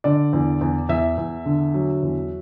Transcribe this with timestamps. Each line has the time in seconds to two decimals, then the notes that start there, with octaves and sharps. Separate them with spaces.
0.04 D3 D5
0.33 E2
0.61 E2
0.89 E2 E5
1.18 E2
1.46 D3
1.74 F#3
2.03 E2